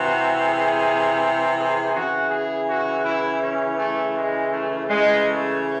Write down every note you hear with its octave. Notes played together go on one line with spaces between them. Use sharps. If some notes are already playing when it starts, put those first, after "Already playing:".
Already playing: C3 E3 F#4
G#4
G#4
C#3 E3 F#4
G#4
F#4
E4
C#4
A3
G#3
A3
C#3 E3 G#3
A3